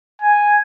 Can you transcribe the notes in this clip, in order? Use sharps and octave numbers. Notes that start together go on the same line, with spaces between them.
G#5